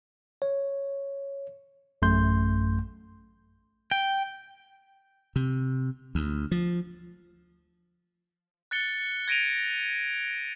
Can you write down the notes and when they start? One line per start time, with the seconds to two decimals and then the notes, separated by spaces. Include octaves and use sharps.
0.42 C#5
2.02 A1 F#2 A3 C6 G6
3.91 G5
5.36 C3
6.15 D2
6.51 F3
8.71 F#6 A6 C#7 G7
9.28 G#6 A#6 D7 D#7 F7